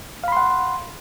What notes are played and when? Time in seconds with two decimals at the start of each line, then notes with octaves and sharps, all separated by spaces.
0.24 F5
0.28 B5
0.32 C6
0.37 F#5